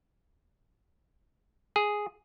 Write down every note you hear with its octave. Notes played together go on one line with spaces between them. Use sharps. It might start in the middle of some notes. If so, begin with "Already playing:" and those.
G#4